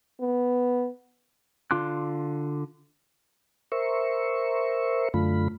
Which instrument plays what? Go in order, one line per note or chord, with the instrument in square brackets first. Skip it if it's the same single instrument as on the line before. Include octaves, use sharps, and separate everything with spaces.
[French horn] B3
[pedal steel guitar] D3 F4 C6 D6 F#6
[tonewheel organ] A#4 C5 E5 C#6
F#2 D3 A3 F4 B5